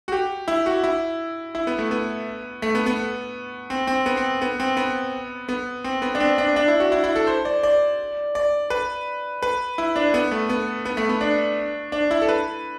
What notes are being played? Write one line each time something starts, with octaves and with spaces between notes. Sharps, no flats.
F#4
G4
E4
F#4
E4
E4
B3
A3
B3
A3
B3
B3
C4
C4
B3
C4
B3
C4
B3
B3
C4
B3
D4
C4
D4
D4
E4
F#4
E4
E4
A4
C5
D5
D5
D5
B4
B4
E4
D4
B3
A3
B3
B3
A3
B3
D4
D4
E4
A4
B4